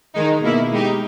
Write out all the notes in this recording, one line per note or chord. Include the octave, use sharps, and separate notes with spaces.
D#3 G#3 D#4
B2 A#3 E4
G#3 D#4 G4